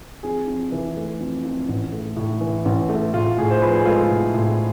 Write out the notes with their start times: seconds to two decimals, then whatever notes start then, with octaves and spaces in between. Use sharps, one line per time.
0.23 F2 G#4
0.47 F2
0.72 E3
0.97 A3
1.20 F2
1.45 F2
1.68 A1
1.92 A3
2.16 A2
2.41 E3
2.65 A1
2.89 A3
3.13 A2 F4
3.38 A2 G#4
3.50 C5
3.61 F3 G#4 B4
3.75 G#4
3.85 G#3 F4 A4
4.10 A2
4.34 A2